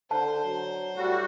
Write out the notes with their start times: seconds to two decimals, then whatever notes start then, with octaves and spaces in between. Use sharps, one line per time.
0.11 D3 C5 A5
0.44 F#3
0.97 A2 G3 F#4